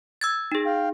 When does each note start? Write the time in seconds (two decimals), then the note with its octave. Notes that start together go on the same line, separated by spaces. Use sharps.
0.21 E6 G#6 A6
0.52 D#4 G#4
0.66 F5 G5